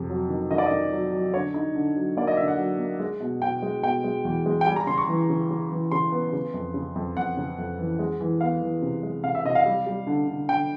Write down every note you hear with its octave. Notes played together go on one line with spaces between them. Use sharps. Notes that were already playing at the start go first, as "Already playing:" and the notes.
Already playing: F2 C3
F#3
D#3
D#3 D#5
D5
D#3 D#5
F#3
F#3
D3 C#5
D#4
D3
F#3
A#3 D5
D#5
D3 E5
F#5
F#3
A#3
G#3
B2
B2 G5
G#3
B2 G5
G#3
E2
G#3
G5
G3 G#5
A#5
C#3 C6
C#6
E3
C#3
C#3
E3
C#3 C6
B3
C#3
F2
C#3
F2
F2 F#5
C#3
F2
E3
G#3
E3
B3 F5
E3
C3
G#3
C3 F5
E5
C3 D#5
F5
G3
G3
D3
D3
D3 G5